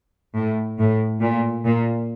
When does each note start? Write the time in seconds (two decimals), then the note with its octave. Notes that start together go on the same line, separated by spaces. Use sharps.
0.35 A2
0.79 A2
1.21 A#2
1.64 A#2